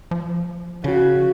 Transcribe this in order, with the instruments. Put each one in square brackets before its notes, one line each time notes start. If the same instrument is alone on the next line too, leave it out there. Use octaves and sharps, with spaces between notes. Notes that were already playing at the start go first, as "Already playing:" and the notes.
[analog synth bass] F3
[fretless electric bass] C#3 [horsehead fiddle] F#4